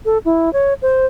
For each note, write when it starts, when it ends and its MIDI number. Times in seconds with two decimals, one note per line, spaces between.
0.05 0.18 69
0.25 0.52 64
0.53 0.74 73
0.82 1.06 72